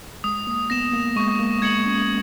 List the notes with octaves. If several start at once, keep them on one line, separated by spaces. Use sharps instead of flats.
G#3 D#6
A#3
B3 A#6 E7
A#3
G#3 C#6
A#3
G#3 G#6 C#7 F#7
C#4